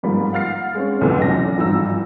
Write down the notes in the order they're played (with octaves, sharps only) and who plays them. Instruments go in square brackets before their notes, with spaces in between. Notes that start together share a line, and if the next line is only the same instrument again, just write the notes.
[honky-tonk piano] G1 G#2 F3 G3 A#3 B5
F5 F#5 F6 A6 C7
G#3 C4 C#4
F1 B1 F2 A2 D3 B3
E2 F#3 C#4 A#6
G#1 G2 E3 F3 D#4 E6